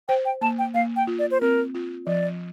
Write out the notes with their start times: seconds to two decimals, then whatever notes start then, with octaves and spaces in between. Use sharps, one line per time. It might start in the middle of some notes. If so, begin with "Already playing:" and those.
0.08 C5 G5
0.25 G5
0.41 A#3 A5
0.59 G5
0.74 A#3 F5
0.96 G5
1.07 F4
1.19 D5
1.31 C5
1.41 C4 A#4
1.74 F4
2.07 F3 D5